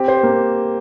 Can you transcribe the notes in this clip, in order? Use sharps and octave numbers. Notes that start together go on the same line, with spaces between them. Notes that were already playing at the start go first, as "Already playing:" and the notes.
Already playing: C4 G4
C5
A#3